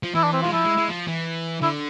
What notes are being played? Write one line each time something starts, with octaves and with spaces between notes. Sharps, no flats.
F3
E3 E4
D4
C4
G#3 F4
F3 E4
G#3
G#3
F3
E3
D3 E4